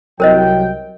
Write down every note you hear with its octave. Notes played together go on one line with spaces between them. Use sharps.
C2 F#3 A#4 C5 D#5 G5